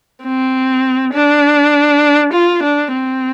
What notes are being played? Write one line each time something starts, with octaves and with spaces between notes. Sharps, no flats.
C4
D4
F4
D4
C4